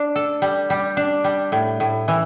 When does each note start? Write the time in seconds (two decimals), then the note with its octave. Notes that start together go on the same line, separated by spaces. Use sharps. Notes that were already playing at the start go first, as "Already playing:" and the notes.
Already playing: D4
0.15 A4
0.42 G3
0.70 G3
0.97 D4
1.24 G3
1.52 A2
1.80 A2
2.08 E3